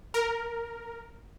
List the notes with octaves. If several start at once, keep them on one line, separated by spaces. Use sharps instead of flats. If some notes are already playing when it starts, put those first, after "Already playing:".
A#4